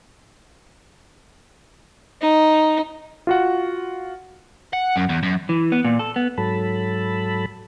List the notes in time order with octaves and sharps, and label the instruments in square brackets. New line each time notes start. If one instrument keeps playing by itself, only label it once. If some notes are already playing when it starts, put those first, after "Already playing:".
[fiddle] D#4
[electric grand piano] F4 F#4 F#5
[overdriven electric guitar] F#5
F#2
E2
F#2
[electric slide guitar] E3
B3
A#2
A4
B3
[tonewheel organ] G#2 F#3 A4 A5 B5